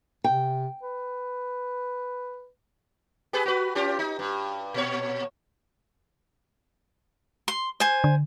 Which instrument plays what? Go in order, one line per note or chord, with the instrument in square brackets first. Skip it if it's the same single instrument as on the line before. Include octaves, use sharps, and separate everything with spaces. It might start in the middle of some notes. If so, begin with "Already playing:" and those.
[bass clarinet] C3 [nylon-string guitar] G5
[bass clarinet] B4
[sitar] G4 G#4 B4
F#4 B4
C#4 F4 G4
D#4
G2
A#2 C#5
[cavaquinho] C6
C5 G#5
[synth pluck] D3